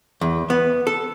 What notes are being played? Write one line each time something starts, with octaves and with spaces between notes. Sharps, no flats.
E2
B3
A4